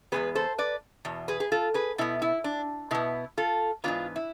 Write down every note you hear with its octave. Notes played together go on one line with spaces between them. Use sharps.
E2 B2 G#3 B3 G#4 B4
A4 C5
B4 D5
E2 B2
G#4 B4
G#4
F4 A4
G#4 B4
B2 B3 E4
E4
D4
B2 B3 E4
F4 A4
G#2 E3 B3 D4 F4
E4